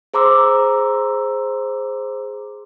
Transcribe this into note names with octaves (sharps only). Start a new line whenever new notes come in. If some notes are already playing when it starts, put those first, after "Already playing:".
G#4 C5 A#5 C6 D6 E6